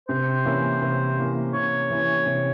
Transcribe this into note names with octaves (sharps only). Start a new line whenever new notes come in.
C3 C5
E3 A#3 C#4 E4
C3
E3 A#3 C#4 E4
C3 C#5
E3 A#3 C#4 E4
C3